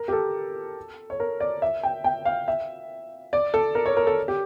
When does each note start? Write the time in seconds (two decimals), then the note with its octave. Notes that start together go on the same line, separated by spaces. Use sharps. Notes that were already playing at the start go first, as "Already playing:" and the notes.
Already playing: A#4
0.08 G4
0.13 A4
1.10 C#5
1.20 A#4
1.40 D5
1.62 E5
1.83 G5
2.04 G5
2.25 F5
2.48 E5
3.33 D5
3.54 A4
3.75 A#4
3.86 C#5
3.97 A#4
4.07 A4
4.28 G4